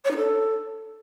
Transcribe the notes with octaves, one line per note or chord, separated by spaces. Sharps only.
C#5
D#4
A4